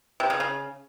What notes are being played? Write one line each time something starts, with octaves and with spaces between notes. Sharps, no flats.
C3
C#3
C#3